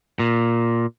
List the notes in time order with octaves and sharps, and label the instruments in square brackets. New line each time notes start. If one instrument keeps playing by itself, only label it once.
[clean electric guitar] A#2